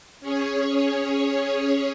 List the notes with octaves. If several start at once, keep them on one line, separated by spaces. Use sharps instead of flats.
C#4 G#4 C#5